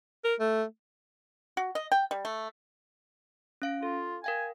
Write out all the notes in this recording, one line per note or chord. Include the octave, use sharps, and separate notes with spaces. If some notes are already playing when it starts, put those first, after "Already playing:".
A#4
A3
F#4
D#5
G5
G3
A3
C#4 F5 D7
F4 A4
A#4 F5 G5 G#5